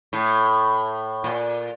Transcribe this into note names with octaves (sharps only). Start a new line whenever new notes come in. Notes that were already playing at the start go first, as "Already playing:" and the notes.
A2
A#2